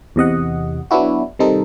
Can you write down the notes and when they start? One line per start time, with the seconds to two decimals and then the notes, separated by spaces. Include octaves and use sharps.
0.16 E2 C3 D#5 F#5
0.91 F#3 B3 D4 E4 F#4
1.39 C3 D#3 G3 C4 D#4 A4